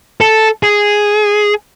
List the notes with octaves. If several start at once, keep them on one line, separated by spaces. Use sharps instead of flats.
A4
G#4